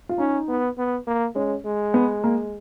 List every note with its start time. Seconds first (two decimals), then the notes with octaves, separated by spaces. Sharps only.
0.09 F4
0.18 C#4 D#4
0.48 B3
0.78 B3
1.07 A#3
1.35 G#3 C#4
1.65 G#3
1.94 B3
2.24 A#3